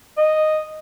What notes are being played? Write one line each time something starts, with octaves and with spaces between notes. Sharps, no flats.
D#5